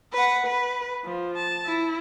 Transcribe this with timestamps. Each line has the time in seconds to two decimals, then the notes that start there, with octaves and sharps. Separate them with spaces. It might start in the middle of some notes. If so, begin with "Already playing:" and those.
0.13 B4 F#5
0.47 B4
1.05 F3
1.37 A5
1.66 E4